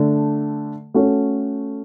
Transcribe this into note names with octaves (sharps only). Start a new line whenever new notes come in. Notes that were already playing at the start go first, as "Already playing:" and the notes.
Already playing: D3 A3 D4
A3 C#4 F#4 A4 C#5